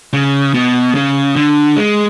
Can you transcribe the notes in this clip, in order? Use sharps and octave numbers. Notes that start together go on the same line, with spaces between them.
C#3
B2
C#3
D3
G#3